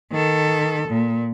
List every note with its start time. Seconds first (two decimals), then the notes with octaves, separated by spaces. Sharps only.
0.12 D#3 A4
0.88 A#2